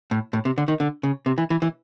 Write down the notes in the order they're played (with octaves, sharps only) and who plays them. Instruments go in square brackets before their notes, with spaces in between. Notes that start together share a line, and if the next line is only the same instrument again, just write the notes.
[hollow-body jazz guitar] A2
A2
C3
D3
D#3
D3
C#3
C3
E3
E3
E3